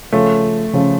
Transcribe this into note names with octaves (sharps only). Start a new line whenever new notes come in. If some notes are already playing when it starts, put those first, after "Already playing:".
C#3 F3 A3 C#4 F4
C#3 F3 C#4 F4